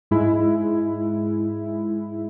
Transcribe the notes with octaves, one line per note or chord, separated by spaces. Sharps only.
G#2 G#3 E4